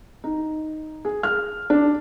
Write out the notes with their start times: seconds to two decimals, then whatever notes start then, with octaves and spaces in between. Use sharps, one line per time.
0.24 D#4
1.05 G#4
1.23 F6
1.70 D4